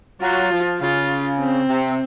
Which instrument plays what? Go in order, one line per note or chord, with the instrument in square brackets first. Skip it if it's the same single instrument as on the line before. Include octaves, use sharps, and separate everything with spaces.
[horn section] F#3 [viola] F4
[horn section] F3
[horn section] C#3 [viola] F4
[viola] C4
[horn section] C3